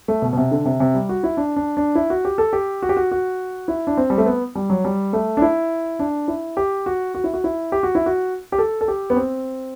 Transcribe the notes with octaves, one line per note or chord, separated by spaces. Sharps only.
A3
B2
B2
C3
D3
C3
C3
G3
F#4
E4
D4
D4
D4
E4
F#4
G4
A4
G4
F#4
G4
F#4
F#4
E4
D4
C4
G3
A3
B3
G3
F#3
G3
A3
D4
E4
D4
E4
G4
F#4
F#4
E4
F#4
E4
G4
F#4
E4
F#4
G4
A4
A4
G4
B3
C4